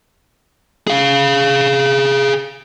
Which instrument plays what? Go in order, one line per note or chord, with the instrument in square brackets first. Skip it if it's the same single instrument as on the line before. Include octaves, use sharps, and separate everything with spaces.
[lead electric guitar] G#4 F5